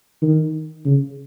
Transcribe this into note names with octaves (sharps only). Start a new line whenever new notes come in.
D#3
C#3